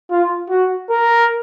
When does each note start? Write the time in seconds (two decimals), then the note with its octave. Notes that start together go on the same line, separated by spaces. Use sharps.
0.11 F4
0.50 F#4
0.90 A#4